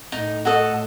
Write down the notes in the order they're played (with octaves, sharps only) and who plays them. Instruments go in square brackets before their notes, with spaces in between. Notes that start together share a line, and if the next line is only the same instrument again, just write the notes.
[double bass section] A2 [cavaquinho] D#4
[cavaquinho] F#4 A4 D#5